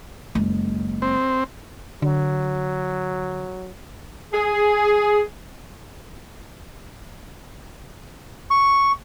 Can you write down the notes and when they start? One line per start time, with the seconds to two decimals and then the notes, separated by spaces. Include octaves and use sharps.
0.35 F#1 G#3
1.02 C4
2.02 D3 F#3
4.33 G#4
8.51 C#6